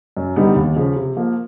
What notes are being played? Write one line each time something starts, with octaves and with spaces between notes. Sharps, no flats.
F#2
D3 G3 B3 D#4
D#2
C#3 F3
C3
F3 A#3